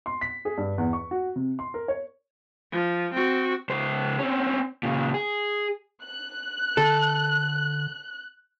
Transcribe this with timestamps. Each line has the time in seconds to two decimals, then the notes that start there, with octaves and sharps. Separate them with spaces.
0.06 C6
0.21 B6
0.45 G#4
0.57 G2
0.78 E2
0.93 C#6
1.11 F#4
1.36 C3
1.59 C6
1.74 A#4
1.88 C#5
2.72 F3
3.13 C4 F#4
3.69 C#2 C5
4.19 C4 C#4
4.83 A#2 C#3
5.14 G#4
6.02 F#6
6.77 D3 A4